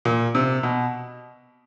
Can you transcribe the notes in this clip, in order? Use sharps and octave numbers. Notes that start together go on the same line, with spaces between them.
A#2
C3
B2